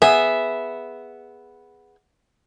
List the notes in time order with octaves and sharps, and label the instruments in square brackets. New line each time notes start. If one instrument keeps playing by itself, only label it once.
[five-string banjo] B3 G#4 G#5 [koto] E5